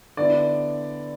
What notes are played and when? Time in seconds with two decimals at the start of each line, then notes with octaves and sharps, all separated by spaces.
0.17 D3 B3 E4 D5